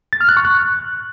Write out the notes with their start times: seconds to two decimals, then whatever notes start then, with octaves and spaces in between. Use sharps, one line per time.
0.13 A6
0.21 F6
0.29 F#6
0.37 C#6
0.45 F#6